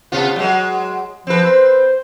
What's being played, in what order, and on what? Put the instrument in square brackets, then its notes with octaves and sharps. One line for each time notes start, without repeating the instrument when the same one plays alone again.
[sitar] C3 B3 F4
F#3 G#3
[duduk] F3 [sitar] C4 B4
[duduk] C5